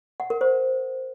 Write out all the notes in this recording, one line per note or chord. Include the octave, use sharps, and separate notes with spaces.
F#5
A#4
C5